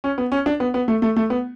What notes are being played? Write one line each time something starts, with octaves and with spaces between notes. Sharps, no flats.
C#4
B3
C#4
D4
B3
B3
A3
A3
A3
B3